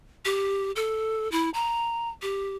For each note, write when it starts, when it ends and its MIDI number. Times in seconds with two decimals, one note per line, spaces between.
0.25 0.71 67
0.76 1.30 69
1.31 1.50 64
1.54 2.09 82
2.22 2.56 67